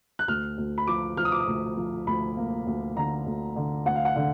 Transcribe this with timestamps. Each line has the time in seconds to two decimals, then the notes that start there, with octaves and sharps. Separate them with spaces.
0.19 F#6
0.28 D2 F6
0.58 D2
0.78 B5
0.87 F3 D6
1.17 F3 F6
1.25 D#6
1.32 D6
1.39 D#6
1.47 D2
1.77 F3
2.07 D2 B5
2.37 A#3
2.67 D2
2.96 D3 A#5
3.26 D2
3.56 D3
3.86 D2 F#5
3.95 F5
4.05 F#5
4.16 D3